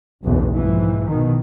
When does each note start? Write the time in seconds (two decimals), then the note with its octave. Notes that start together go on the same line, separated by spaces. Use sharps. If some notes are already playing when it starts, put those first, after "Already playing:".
0.24 F#1 B1 E2
0.55 G#2 E3 F3
1.09 B2 D#3